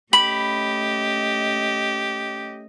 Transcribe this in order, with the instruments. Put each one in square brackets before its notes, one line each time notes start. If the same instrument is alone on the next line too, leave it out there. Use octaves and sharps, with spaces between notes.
[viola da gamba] A3 C#4 D#5 [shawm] G4 [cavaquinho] B5 [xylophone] F#7